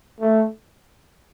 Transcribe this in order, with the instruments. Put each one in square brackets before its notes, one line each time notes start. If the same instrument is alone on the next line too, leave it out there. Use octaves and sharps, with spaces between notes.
[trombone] A3